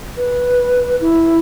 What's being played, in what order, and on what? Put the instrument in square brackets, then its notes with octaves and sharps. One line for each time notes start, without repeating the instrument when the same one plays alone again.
[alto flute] B4
E4